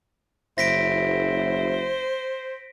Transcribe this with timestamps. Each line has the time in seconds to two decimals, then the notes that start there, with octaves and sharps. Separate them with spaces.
0.58 F#1 E4 C5 A#6 B6 D7